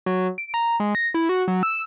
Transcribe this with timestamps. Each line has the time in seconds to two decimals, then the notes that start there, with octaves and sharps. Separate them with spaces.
0.06 F#3
0.38 D7
0.54 A#5
0.80 G#3
0.95 A#6
1.14 E4
1.29 F#4
1.48 F#3
1.63 E6